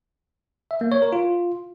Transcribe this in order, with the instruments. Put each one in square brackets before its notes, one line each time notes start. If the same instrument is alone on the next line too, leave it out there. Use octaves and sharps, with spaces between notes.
[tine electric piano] E5
A#3
C#5
A#4
F4